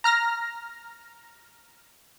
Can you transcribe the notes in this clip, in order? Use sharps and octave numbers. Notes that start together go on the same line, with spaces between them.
A#5 F6 A#6